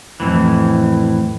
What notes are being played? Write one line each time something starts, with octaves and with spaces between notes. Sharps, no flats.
F2 A2 E3